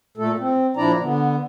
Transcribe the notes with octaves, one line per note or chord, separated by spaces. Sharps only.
A#2 A3 A4
C4
A#2 F3 D4 E4 D5 A#5
D3 B3